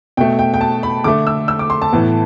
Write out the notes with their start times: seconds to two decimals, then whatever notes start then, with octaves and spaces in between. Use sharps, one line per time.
0.17 B2 A3 G5
0.39 G5
0.54 G5
0.61 A5
0.83 B5
1.04 D3 A3 D6
1.27 E6
1.48 E6
1.59 D6
1.70 C6
1.82 A5
1.92 A2 E3 B3